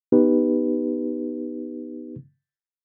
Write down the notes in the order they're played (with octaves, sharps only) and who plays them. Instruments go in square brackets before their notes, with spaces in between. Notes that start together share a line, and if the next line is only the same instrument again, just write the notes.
[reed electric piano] B3 D#4 G4 B4